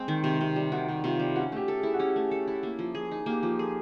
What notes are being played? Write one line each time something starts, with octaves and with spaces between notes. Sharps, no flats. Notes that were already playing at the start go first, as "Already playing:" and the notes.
Already playing: G#3 C4
D#3
C3
C3
G3
D#3 F#4
C3
C3 F4
G3
C#4 F#4
A3 G4
A4
G#4
E4
F#4
C#4 G4
A3
A4
E4
A#3
F3
G#4
D#4
A#3 G4
F3
G#4 A4